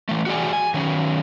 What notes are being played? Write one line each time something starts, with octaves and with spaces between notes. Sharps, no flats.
E3 A3
F#4 G#4 D5 G#5
G#5
D#3 F#3 C#4